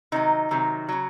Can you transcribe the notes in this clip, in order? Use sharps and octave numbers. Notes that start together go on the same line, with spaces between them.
C3 D#3 F#3 D#4
C3 D#3 F#3
C#3 F#3